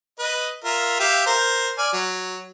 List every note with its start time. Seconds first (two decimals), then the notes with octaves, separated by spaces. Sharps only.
0.19 B4 D#5
0.64 F4 A#4 E5
0.99 G4 E5 F5
1.26 A#4 C5
1.78 D5 G#5 F6
1.93 F#3